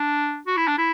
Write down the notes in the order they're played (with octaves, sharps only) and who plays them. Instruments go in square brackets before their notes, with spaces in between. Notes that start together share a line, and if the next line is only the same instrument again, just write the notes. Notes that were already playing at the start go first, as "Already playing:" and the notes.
Already playing: [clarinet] D4
F#4
E4
D4
E4